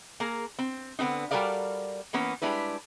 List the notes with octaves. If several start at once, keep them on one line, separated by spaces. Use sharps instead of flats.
A#3 G#4 A#4
C4
D3 B3 C4 D#4
G3 F#4 A4 A#4 D5 F5
E3 A#3 B3 C#4
G3 G#3 D4 E4 B4